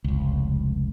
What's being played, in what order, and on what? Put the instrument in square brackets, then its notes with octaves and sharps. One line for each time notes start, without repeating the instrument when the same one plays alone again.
[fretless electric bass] F1 C#2